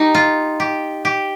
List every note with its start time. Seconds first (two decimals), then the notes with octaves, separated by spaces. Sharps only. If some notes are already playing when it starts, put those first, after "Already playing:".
Already playing: D#4 G4
0.15 F4
0.60 G4
1.05 G4